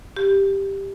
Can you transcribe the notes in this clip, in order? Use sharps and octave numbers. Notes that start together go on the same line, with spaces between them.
G4